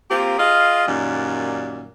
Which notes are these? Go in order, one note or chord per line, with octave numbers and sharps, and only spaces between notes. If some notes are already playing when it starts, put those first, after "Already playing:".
A#3 C4 F4 G4
F4 G#4 D#5 F5
F#2 A#2 D#3 G3